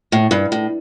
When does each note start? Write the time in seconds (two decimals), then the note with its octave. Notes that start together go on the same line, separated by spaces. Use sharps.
0.12 A2
0.31 G2
0.52 A2